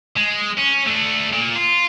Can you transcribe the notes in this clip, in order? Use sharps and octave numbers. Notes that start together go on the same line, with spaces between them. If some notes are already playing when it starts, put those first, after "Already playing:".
G#3
C#4
A3 D4
A#2
F4